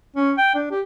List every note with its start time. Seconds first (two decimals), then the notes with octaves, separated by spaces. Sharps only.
0.16 C#4
0.38 G5
0.55 D4
0.71 G4